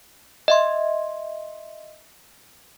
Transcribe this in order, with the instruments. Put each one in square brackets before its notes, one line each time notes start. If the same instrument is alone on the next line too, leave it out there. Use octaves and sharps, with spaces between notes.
[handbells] D#5 E5 C6